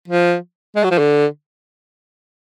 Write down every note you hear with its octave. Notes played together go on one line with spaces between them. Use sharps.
F3
G#3
F#3
F3
D3